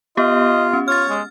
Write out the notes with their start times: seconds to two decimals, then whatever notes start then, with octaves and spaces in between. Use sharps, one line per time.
0.17 B3 F4 G4 D#5
0.73 C#4
0.88 F4 C#5 F6 A6
1.09 G#3